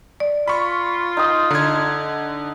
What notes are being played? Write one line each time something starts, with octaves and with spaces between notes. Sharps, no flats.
D5
F4 B5 C#6
D#4 D#6
D3 D#4 G#6